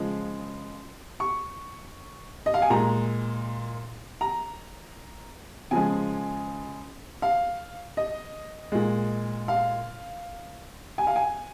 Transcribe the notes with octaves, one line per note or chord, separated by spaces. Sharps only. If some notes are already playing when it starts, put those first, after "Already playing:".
Already playing: C#3 F3 G#3
C#6
D#5
F5
G#5
A#2 G#3 A#5
A#5
C#3 F3 G#3 G#5
F5
D#5
A#2 G#3
F5
G#5
F5
G#5